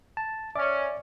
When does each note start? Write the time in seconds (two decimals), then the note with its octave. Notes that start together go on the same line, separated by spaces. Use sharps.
0.17 A5
0.55 C#4 D5 E5 D6